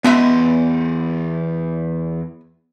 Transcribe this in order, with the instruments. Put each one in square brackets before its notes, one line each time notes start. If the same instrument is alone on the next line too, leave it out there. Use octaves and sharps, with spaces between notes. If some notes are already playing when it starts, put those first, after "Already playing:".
[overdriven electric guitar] E2 C6 [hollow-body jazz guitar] B3 D#5 E5